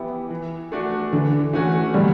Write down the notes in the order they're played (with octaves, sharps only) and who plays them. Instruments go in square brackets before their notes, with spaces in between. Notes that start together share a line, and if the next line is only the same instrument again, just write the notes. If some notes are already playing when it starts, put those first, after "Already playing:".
Already playing: [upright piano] E3 B3 E4 G4
E3
A3 D4 F#4
[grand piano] D3 [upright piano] E3
[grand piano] E3 [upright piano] A3 C#4 F#4
[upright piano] D3 [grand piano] G3